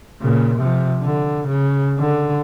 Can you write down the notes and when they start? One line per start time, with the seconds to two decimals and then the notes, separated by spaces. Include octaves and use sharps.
0.21 A#2 C#3
0.58 C3 F3
1.03 D3
1.48 C#3
1.99 D3